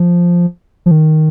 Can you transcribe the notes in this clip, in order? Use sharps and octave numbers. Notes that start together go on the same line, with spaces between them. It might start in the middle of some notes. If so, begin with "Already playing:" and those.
Already playing: F3
F3
D#3